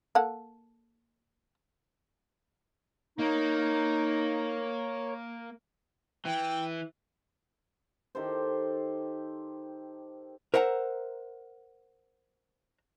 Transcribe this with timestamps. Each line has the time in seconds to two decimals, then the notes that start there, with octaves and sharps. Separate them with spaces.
0.15 A#3 A4 F#5
3.19 A#3 D#4 A#4 C#5
6.25 E3 G5
8.15 D#3 G4 A4 C5
10.54 A#4 C5 E5 F#5 G#5 A#5